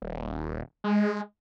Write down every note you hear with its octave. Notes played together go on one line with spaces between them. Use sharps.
D#1
G#3